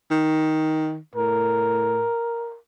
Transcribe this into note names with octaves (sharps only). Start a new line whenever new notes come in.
D#3
A2 A#4